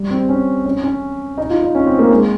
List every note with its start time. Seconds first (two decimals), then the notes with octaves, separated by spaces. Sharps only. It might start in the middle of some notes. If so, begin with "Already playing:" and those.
Already playing: G3
0.10 C4
0.29 C#4
0.66 C#4
0.84 C#4
1.38 D#4
1.50 F4
1.62 D#4
1.75 C#4
1.86 C4
1.99 A#3
2.11 G#3